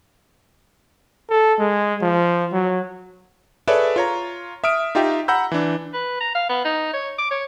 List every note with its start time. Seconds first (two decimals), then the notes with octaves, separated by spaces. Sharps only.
1.30 A4
1.59 G#3
2.02 F3
2.53 F#3
3.68 G#4 A4 B4 C#5 D5 E5
3.96 F4 C#5 A#5
4.64 E5 D#6 F6 D7
4.95 D#4 F4 G4 E5 G5
5.28 F#5 A#5 B5 E6 G6
5.52 E3 D4
5.93 B4
6.20 A#5
6.35 F5
6.49 B3
6.65 D#4
6.93 C#5
7.18 D6
7.31 C#5